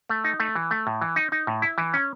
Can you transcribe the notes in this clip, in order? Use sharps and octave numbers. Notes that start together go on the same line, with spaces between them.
A3
D#4
A3
E3
A3
A2
E3
D#4
D#4
A2
E4
E3
C#4